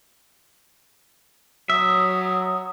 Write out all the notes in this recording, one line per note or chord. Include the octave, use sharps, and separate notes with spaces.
F#3 E5 D#6